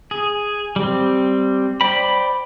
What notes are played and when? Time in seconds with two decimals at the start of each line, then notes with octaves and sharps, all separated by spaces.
0.11 G#4
0.76 G3 C4
1.81 C5 D5 G5 B5